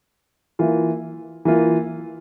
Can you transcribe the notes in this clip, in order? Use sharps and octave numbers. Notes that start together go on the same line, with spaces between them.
E3 A#3 F4
E3 A#3 F4